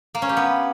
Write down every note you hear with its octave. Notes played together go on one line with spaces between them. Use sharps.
A#3
C#4
G4
B3